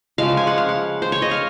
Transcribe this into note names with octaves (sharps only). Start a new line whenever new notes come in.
C#3 F3 G#3 F5
G#5
F#5
F5
F#5
C5
C#5
D#5
F5